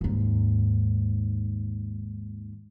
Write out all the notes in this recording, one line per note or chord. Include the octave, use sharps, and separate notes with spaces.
D#2 G#2